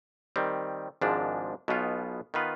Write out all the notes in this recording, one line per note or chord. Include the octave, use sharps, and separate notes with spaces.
D#3 G3 C4
G#1 G#2 F3 G#3 D4
B1 B2 B3 F4
D#3 B3 F4 B4